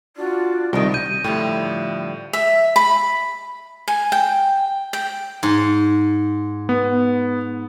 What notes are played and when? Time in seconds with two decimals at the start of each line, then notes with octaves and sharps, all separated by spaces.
0.16 D4 F4 F#4 D5
0.73 C2 D#3 G4
0.94 G6 D#7
1.24 A2 D3 F3 G3 E4 G4
2.33 E5
2.76 B5
3.88 G#5
4.12 G5
4.93 G5
5.43 G#2
6.69 B3